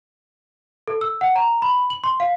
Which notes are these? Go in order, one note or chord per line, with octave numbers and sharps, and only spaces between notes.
A4
E6
F#5
A#5
B5
F#7
C6
F5